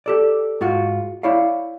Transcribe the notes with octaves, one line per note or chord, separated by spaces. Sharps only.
G4 A4 D5
G#2 F4 F#4
E4 C#5 D5 F5